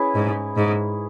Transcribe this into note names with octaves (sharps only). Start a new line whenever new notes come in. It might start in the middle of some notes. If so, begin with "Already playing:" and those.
Already playing: C#4 E4 G#4 B4
G#2
G#2